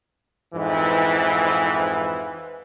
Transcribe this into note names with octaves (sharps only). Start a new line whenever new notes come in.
F2 G#2 E3